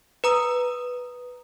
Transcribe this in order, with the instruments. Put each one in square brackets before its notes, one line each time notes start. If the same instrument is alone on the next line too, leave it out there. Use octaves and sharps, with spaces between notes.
[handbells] B4 A#5 D#6